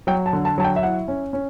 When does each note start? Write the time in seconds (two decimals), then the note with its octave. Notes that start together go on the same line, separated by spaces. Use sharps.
0.07 F#3 G5
0.26 A5
0.33 D3
0.45 A5
0.58 F#3 A5
0.64 G5
0.76 E5
0.83 E4 F#5
1.08 C#4
1.33 C#4